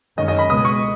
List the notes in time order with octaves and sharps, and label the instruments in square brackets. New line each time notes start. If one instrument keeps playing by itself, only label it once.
[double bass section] F#2 D#3 G#3 C#4 [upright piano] D#5
[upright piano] D#5
B5
[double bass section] C#2 B2 G#3 B3 [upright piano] D#6
[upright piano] C#6